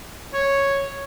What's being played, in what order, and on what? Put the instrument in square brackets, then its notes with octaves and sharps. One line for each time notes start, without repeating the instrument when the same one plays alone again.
[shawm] C#5